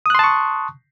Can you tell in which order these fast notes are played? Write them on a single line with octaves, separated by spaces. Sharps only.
D#6 F#6 C6 A5 C#6